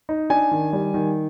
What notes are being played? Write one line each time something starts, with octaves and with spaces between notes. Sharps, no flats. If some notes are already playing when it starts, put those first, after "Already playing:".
D#4
D4 G#5
D#3
G3
D#3